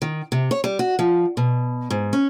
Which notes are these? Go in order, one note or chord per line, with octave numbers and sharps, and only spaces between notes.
D#3
C3
C#5
G3
F#4
F3
B2
G#2
C#4